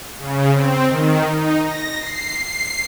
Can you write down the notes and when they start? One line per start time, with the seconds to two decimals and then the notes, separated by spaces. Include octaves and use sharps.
0.19 C#3
0.54 C4
0.85 D#3
1.31 D#4
1.62 A#6
1.98 C7
2.42 C7